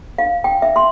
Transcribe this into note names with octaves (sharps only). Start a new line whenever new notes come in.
F5
G5
E5
C6